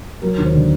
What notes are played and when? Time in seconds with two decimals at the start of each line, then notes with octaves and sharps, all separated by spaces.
0.22 F#3 A#4
0.38 D#2
0.45 C5
0.53 D3